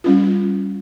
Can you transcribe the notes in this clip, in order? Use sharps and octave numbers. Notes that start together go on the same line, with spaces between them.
G3 C#4 F4